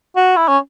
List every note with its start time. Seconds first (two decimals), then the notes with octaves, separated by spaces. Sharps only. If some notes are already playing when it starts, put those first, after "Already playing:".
0.16 F#4
0.37 E4
0.48 C#4